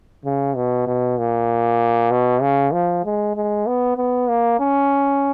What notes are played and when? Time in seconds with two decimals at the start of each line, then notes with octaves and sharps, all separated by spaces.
0.25 C#3
0.56 B2
0.87 B2
1.18 A#2
2.11 B2
2.41 C#3
2.73 F3
3.04 G#3
3.35 G#3
3.67 B3
3.97 B3
4.28 A#3
4.60 C#4